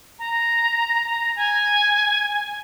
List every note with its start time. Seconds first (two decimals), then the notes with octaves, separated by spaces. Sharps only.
0.19 A#5
1.36 G#5